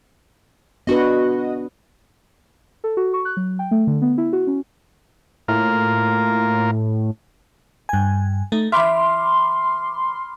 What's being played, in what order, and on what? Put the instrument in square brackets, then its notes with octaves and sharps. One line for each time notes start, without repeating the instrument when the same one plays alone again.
[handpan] B3 D4 B4 [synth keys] F#4 D#5
[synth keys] A4
F#4
C#6
F#6
F#3
G5
A3
D3
B3
E4
F#4
C#4
[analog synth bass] A2 [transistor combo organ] A#3 F4 A#4
[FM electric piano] G2 G#5
[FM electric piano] A3 [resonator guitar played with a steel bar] D#4
[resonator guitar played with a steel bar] E3 E5 [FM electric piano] B5 D6 F6 [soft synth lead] C6